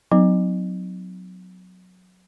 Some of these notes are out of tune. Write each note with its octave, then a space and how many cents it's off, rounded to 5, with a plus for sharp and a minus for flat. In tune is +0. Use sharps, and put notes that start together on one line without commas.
F#3 -15 B3 +45 D#4 +0